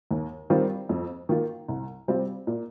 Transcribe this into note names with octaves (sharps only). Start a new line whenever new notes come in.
D#2
D#3 G3 C4 F4
F2
D#3 A#3 F4
C2
C3 G3 C4 F4
A#2